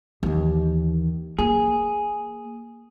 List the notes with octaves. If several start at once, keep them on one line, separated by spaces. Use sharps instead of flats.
D#2 E3
A#3 G#4